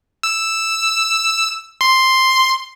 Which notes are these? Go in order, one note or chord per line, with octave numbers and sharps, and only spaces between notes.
E6
C6